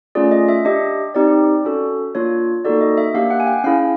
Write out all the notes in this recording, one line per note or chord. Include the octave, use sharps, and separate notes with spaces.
A3 C#4 F4 G#4 D5
D#5
E5
D4 G4 D#5
C4 D#4 G4 D5
C#4 F#4 A4
A#3 D4 F4 C#5
A#3 D#4 F#4 A4 D5
D#5
E5
A#3 D4 G4 F5
F#5
G#5
G5
C#4 E4 G#4 F5